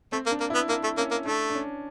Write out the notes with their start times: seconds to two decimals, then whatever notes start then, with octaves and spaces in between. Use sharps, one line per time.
0.12 A3 C4
0.26 A#3
0.31 D4
0.40 A#3
0.50 E4
0.54 B3
0.69 A#3 D4
0.84 A3
0.97 A#3 C#4
1.11 A#3
1.26 A3 D4
1.50 D4
1.55 C#4